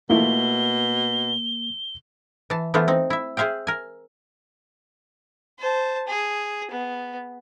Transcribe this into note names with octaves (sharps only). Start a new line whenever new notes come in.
B2 A3 A#3 E4 F4 G7
E3 A5
E3 A3 B3 F4 C5
C4 D#4
E4 E5
G#4 C5 E5 F5 G5
A#4 G#5
C5 A5
G#4
B3